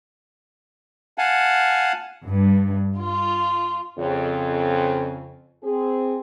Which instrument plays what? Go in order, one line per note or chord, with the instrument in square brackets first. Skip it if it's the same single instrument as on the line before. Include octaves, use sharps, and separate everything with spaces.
[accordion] F5 F#5 G#5 A5
[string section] G2
F4
[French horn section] F2 C#3
C4 G#4